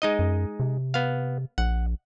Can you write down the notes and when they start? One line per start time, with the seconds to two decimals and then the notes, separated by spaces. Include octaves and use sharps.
0.02 G#3 D#4 D#5
0.19 F#2
0.60 C3
0.94 B3 F5
1.58 A#1 F#5